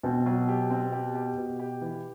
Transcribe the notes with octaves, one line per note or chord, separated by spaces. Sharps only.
B2 C4
F#3
G4
C4
G4
G4
B2
G4
E3